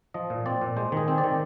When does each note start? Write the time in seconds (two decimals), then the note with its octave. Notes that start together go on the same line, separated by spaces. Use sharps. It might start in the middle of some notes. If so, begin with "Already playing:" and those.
0.14 F3 D#5
0.30 A#2
0.46 C4 D5
0.62 A#2
0.77 G#3 C5
0.92 D#3 G#4
1.08 C4
1.18 D5
1.24 D#3